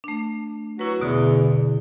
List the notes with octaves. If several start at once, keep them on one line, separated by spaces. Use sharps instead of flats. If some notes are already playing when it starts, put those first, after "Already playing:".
A3 D4
F#3 E4 F#4 B4
E2 B2 D3